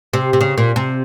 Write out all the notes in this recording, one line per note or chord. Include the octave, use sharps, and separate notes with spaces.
C3
C3
C#3
A#2
C3